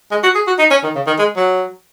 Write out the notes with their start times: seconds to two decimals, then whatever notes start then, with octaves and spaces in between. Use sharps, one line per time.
0.11 G#3
0.23 F#4
0.35 G#4
0.47 F#4
0.59 D#4
0.71 C#4
0.83 D#3
0.95 C#3
1.07 D#3
1.19 G#3
1.36 F#3